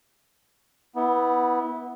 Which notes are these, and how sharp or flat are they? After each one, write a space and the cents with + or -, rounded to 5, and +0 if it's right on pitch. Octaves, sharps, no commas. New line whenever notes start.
B3 +0 E4 -30